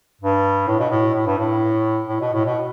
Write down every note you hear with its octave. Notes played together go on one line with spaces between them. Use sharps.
G2
A2
B2
A2
A2
G2
A2
A2
B2
A2
B2